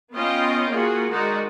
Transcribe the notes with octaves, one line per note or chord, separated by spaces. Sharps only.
B3 C#4 F4 D#5 F5 G5
A#3 F4 F#4 G#4
D#3 G#3 D#4 F#4 A#4 D5